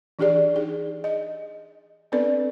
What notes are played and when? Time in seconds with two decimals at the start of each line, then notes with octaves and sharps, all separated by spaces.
0.19 E3 D4 G4 G#4 D5
0.54 D#4 G#4
1.04 D#5
2.12 B3 C4 D4 A4 B4 D5